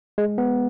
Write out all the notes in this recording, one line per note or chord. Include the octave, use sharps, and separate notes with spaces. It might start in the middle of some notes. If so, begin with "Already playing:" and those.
G#3
B3